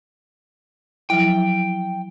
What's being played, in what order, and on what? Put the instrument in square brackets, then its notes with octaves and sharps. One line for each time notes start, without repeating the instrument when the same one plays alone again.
[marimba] F3 F#3 E4 [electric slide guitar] G5